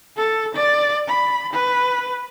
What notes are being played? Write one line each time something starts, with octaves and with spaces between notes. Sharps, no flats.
A4
D5
B5
B4